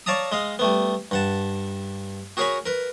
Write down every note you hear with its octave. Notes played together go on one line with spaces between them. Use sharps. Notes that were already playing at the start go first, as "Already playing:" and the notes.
C#5 D5 F5 A5 A#5 D#6
G#3 D#5 F5
G3 A3 B3
G2 F#5 A5
F#4 G#4 A#4 C#5 G#5 B5
A#4 B4